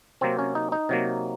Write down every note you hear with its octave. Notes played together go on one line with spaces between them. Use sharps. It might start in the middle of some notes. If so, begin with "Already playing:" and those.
C3 F#3 A#3 C4
C#4
D#4
D#4
C3 F#3 A#3